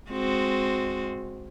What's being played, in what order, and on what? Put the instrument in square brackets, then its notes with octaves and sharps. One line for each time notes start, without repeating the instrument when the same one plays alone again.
[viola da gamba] G#3 C4 F#4